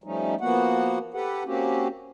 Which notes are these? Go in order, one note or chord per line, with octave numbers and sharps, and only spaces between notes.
F3 G3 A3 C#4 D#4
F3 A#3 B3 F#4 F#5
G4 A4 B4 F#5
A#3 C4 C#4 F#4 G4